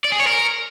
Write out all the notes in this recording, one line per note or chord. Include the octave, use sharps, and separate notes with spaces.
D5
G#4
C#5
A#4